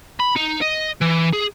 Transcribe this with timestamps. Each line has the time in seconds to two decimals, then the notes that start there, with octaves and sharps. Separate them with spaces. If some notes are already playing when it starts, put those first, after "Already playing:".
0.20 B5
0.36 D#4
0.61 D#5
1.01 E3
1.33 G#4